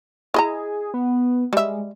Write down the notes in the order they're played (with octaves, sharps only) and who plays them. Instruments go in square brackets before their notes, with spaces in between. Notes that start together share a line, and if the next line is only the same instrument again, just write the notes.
[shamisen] E4 D#5 A#5 [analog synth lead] G#4
[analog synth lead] B3
[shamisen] G3 E5 [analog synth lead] G#3